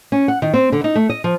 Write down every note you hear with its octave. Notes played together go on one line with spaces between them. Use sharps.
C#4
F#5
D#3
C4
D3
D#4
A3
D#5
F3